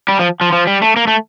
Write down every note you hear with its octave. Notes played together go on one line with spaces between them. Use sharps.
G3
F3
F3
F3
G3
A3
A#3
A3